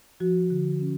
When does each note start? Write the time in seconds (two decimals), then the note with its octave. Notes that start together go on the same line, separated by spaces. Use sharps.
0.20 F3 F#4
0.50 D3
0.81 C#4